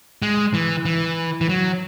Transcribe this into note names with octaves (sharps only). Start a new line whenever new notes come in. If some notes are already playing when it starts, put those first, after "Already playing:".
G#3
E3
E3
E3
F#3